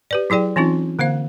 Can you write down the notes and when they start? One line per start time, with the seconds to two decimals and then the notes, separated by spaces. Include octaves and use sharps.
0.11 G4 B4 D5
0.30 F#3 E4 G#4 D5 G5
0.56 E3 C4 C#4 D#4 F4
0.99 D3 A#3 C5 F5